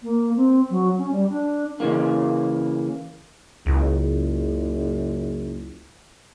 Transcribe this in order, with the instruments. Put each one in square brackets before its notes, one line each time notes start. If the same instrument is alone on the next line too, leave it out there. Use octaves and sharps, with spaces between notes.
[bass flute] A#3
C4
F#3
C#4
G3
D4
[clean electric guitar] C#3 E3 A#3
[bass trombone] F#1 [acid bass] C#2